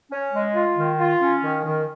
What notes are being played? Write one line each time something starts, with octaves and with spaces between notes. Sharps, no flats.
C#4
G#3
F4
D#3
F4
C#4
D#3
D#3